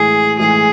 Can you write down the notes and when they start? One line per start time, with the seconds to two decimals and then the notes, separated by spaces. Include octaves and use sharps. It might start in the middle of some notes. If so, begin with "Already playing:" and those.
Already playing: A2 E3 G#3 G#4
0.39 A2 E3 G#3 G#4